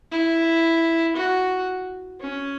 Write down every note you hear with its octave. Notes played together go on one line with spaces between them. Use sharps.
E4
F#4
C#4